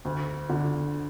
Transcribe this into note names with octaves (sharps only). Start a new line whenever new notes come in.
D2
D3